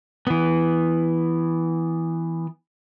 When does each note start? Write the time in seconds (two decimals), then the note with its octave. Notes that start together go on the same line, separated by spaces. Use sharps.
0.27 E3 B3